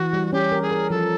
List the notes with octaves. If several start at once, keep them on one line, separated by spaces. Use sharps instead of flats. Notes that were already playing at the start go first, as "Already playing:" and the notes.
Already playing: E3 F#4
G3
C#4 G4
A#4
G#4
A#4
F3 A4